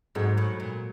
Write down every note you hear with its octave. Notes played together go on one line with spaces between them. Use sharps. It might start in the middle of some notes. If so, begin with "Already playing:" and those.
G#2 F#3 G#3
A2
A#2